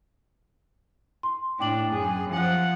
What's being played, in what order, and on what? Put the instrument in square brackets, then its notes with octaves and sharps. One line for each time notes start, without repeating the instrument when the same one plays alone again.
[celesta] C6
[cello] A2 D4 [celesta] G5 D6 F#7
[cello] F#2 G#4
F3 F#5